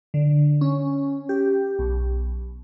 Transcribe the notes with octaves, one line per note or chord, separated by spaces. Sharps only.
D3
C#4
G4
B1